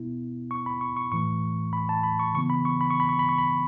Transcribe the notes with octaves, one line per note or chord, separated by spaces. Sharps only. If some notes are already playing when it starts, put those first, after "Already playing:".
Already playing: B2 B3 E4
C#6
B5
C#6
C#6
A2 E3 A3 C#6
B5
A5
B5
C#6
C#3 E3 B3 C#6
B5
C#6
B5
C#6
B5
C#6
B5
C#6
B5